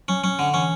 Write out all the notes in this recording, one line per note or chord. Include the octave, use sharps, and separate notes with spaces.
F#3 C#4
F#3 C#4
D3
E3 C#4